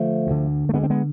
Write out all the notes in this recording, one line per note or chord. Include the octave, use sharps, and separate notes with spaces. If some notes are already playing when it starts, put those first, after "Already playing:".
Already playing: D3 F3 A3
D2 D3
A3
D2 D3 G#3 B3
C4
G#3 B3